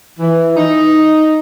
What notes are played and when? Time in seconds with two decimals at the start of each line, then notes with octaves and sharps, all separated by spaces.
0.19 E3
0.57 D#4